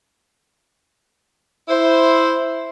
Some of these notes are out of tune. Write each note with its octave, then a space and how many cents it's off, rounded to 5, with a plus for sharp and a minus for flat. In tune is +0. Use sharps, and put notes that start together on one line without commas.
E4 +0 C5 +0